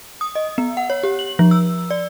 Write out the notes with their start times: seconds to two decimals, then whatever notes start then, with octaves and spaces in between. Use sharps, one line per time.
0.21 D#6
0.35 D#5
0.58 B3
0.77 F#5
0.90 C#5
1.03 G4
1.19 F#7
1.39 F3
1.51 E6
1.91 D5